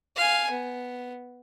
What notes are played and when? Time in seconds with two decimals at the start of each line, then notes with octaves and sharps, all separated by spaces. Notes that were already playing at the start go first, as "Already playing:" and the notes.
0.16 F5 G#5
0.50 B3